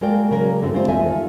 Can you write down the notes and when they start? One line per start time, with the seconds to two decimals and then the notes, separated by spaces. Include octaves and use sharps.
0.01 G#3 A#3 F#4 A#4 D5 G5
0.31 C#3 F#3 A#3 G#4 A#4
0.61 E2 G2 D3 A3 C4 F#4
0.73 G3 G#3 C4 F4 G4 C5
0.88 E2 A4 D#5 E5 G#5
1.06 D#3 F4